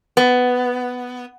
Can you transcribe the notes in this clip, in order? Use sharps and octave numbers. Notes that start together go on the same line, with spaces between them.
B3